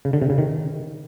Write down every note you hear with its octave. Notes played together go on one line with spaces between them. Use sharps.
C#3
D3
C3
C#3
D#3